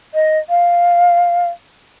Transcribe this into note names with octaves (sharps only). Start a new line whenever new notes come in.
D#5
F5